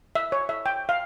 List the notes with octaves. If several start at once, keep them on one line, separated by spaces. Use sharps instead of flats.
E5
C#5
E5
G5
F5